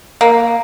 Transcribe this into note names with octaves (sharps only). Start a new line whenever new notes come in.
A#3